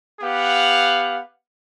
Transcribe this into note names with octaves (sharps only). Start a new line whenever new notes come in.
B3 G4 F5 F#5